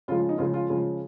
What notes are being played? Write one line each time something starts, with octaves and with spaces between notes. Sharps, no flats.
C#3 F3 G#3 F4
D#4
C#3 F3 G#3 F4
F4
C#3 F3 G#3